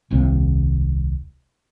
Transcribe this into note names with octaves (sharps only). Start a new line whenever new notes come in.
D#1 C2 C3 A#3